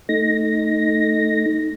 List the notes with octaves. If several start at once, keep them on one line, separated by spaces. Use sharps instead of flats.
A3 D#4 A#6